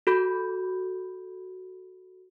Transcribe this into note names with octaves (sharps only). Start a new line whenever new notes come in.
F#4 A4 B5 G6